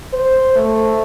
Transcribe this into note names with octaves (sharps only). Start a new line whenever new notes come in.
C5
A3